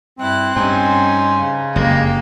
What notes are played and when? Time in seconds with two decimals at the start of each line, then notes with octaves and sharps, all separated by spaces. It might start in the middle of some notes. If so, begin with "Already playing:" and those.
0.19 G2 C4 E4 F#6
0.56 G2 C#4 D#4 C5 G#5
1.38 C#3
1.76 F#1 F2 G#3 A#3 G4